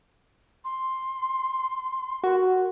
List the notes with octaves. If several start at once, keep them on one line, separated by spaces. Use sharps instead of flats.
C6
F#4 A#4